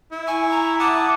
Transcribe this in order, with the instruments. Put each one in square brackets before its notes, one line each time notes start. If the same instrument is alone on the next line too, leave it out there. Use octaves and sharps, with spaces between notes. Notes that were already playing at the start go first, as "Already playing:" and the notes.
[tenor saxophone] E4
[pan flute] G#5 [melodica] C#6
[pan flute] A#5
[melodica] F#5 A5 D#6 [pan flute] D6